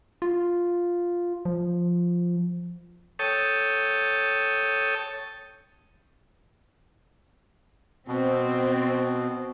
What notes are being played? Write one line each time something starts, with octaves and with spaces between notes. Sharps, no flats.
F4
F3
A4 C#5 G5 A5 D#6
B2 C4